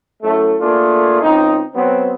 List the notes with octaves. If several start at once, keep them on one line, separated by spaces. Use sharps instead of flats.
F#2 A2 A3
A3 A#3 D4 F4 G#4
C#2 C4 D#4
F#3 B3 C4